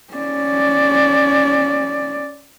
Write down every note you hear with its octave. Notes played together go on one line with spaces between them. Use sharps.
C#4 D5